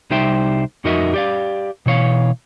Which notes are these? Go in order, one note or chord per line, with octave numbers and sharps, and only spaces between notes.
C2 G3 D#4 C5 E5 G5
F2 D#4 F#4 A#4 D#5 E5
G4 D5 F5
B2 E3 C#5 F5